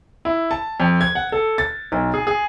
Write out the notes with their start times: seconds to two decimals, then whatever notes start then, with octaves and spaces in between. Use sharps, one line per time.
0.25 E4
0.51 A5
0.80 F2
1.01 G#6
1.15 F#5
1.32 A4
1.58 A6
1.92 B1
2.14 G#4
2.27 G#4